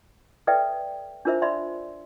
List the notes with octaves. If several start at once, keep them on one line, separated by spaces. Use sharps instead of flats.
A4 B4 D5 E5 G5
D4 F4 A#4 C5 E5
D5 E5 B5 C6